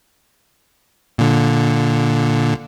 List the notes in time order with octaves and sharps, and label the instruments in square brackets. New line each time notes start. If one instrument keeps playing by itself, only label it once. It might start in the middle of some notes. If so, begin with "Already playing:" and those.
[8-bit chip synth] A#2 D3